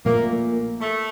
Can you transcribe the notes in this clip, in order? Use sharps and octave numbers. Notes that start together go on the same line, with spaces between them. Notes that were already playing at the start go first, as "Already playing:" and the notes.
A#1 A#2 A3 A#3
A3